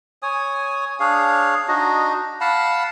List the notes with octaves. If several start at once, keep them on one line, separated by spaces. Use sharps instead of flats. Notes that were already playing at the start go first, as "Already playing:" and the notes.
C#5 G#5 D#6
D4 G#4 C#5 F5
D4 D#4 F#4 D#5
F5 F#5 A5 B5